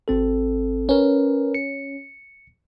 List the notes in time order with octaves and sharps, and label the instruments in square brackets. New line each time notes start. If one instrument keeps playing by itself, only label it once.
[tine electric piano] G#1 C4 A4
[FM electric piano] C#4 [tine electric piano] A#4 B4
[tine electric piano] C#7